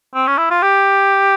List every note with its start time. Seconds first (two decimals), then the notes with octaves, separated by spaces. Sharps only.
0.15 C4
0.27 C#4
0.38 E4
0.51 F4
0.63 G4